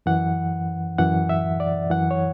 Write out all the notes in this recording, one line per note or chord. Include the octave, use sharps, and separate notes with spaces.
F#2 E3 F#5
F#2 E3 F#5
E5
D5
F#2 E3 F#5
C#5